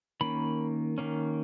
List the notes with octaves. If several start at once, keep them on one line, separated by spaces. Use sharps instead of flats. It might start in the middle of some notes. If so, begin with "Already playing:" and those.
D#3 A#3 C#4 B5
D#3 A#3 C#4